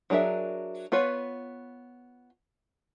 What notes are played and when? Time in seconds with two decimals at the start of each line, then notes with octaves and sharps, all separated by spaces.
0.10 F#3 D4 G#4 A#4 E5
0.92 B3 F4 B4 C#5